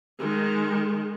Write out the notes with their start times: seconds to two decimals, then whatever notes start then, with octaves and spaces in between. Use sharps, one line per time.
0.19 D#3 G#3